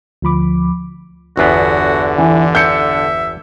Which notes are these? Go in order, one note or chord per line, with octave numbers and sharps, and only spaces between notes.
D2 F3 B5 D6
G1 E2 D3 B3 F#4
E3
E5 G6 C#7